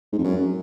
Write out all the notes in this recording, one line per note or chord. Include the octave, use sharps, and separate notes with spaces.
G#2
F2
F#2